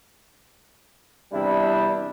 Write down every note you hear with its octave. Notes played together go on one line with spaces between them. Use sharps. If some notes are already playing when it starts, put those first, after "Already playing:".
E2 C3 G3 D4 E4